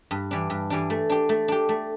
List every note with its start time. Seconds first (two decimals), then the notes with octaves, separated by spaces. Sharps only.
0.11 G2
0.31 E3 G3 D4
0.50 G2
0.70 E3 G3 D4
0.90 A3
1.10 D4 G4
1.29 A3
1.48 D4 G4
1.69 A3